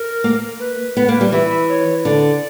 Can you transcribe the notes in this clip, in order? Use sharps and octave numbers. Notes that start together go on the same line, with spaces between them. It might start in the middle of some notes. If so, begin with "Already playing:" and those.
Already playing: A#4
A#3
B4
B3
A#3
G3
E3 E5
C#5
D3 D5